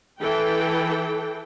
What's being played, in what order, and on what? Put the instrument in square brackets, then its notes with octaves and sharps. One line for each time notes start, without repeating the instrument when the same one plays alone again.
[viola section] E3 A4 G5